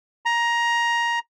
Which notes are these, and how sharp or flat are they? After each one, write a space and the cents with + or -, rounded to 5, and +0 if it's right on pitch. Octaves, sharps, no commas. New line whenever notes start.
A#5 +15